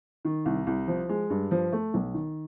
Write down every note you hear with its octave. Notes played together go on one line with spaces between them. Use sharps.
D#3
C2
C2
F3
G#3
G2
F3
A3
B1
D#3